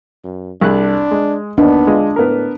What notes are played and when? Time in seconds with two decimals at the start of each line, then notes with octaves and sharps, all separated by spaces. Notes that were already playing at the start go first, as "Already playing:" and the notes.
0.24 F#2
0.61 C2 D4 G#4 F#6
1.11 G#3
1.58 D#2 B3 D4
1.87 G#3 F4
2.16 A2 B3 A#4